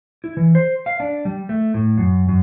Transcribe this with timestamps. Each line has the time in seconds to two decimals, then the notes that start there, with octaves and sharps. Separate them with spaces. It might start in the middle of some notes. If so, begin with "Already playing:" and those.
0.24 E4
0.37 E3
0.55 C5
0.86 F5
1.00 D4
1.25 G3
1.49 A3
1.74 A2
1.98 F#2
2.29 F#2